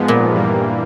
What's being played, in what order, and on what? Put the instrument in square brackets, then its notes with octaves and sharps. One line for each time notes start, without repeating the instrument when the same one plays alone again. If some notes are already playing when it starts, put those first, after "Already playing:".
Already playing: [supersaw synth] G#2 F3 G#3 B3
[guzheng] A#2
[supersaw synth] G2 E3 G3 A#3